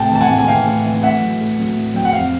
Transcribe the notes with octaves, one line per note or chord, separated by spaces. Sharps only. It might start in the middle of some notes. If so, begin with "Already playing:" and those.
Already playing: A2 C3 G5 A5
E3 A5
F#5 G#5
A2
G#5
E3 F5 G5
A2
E3
A2 E5 F#5
F#3
A2
F#3
A2
F#3 G5
F#5
F2 F5